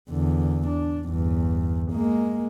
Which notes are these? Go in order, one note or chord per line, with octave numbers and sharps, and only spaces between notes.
E2 D3
D4
G1 E2
G#3 A#3